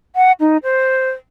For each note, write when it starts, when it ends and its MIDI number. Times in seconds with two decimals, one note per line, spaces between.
0.16 0.32 78
0.40 0.57 63
0.63 1.10 72